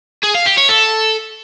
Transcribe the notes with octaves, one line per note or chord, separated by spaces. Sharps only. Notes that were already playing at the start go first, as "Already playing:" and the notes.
G#4
F5
G4
C#5
A4